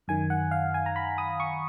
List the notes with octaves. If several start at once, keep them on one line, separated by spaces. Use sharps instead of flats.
F#2 D#3 G#5
F#5
F5
G#5
A#5
B5
D#6
C#6